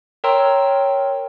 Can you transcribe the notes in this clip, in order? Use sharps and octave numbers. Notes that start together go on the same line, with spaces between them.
A#4 C#5 G5 A#5 C6 E6